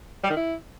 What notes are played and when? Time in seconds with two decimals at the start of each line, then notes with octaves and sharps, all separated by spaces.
0.24 G3
0.30 D#3
0.36 E4